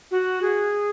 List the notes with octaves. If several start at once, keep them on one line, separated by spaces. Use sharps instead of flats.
F#4
G#4